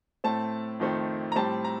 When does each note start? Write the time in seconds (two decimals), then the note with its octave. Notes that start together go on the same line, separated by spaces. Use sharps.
0.24 A2 A3 C4 A5
0.80 F2 D#3 A3 C4
1.32 A#5
1.36 A2 G3 C4 A5
1.64 A#5